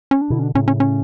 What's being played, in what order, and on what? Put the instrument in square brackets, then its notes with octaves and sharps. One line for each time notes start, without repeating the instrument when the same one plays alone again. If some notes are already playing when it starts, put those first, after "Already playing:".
[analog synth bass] C#4
D4
[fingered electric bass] B2 D3 [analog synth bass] E4
[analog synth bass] C#4
D4
[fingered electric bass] A2 C#3 [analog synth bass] C#4
[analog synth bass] C#4
C#4